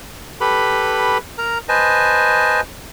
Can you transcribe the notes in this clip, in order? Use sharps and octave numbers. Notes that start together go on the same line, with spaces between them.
G4 A4 B4 B5
A#4 A#5
B4 C5 D#5 G#5 A5